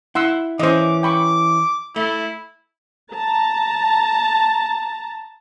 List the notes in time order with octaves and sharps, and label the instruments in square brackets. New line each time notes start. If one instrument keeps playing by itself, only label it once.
[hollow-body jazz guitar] E4 [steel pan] F#5 C6 E6
[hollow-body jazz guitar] E3 C#4 [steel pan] C5 D#5 [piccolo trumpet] D6
[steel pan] G5 B5 C#6 [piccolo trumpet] D6
[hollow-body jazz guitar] A3 [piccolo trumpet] E4
[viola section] A5 A#5